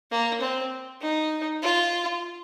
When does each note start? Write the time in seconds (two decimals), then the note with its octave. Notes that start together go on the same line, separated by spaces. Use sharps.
0.11 A#3
0.41 C4
1.01 D#4
1.63 F4